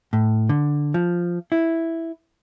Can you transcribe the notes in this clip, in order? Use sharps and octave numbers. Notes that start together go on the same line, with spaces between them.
A2
D3
F3
E4